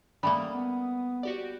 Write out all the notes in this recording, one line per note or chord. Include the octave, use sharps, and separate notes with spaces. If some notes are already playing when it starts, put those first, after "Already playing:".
G3 A3 A#3 C#4 G#5 B5 D#6
B3
F#4 G4 D5